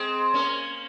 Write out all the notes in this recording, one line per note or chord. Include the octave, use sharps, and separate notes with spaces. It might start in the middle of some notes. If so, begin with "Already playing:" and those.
Already playing: G#3 C4
A#3 C#4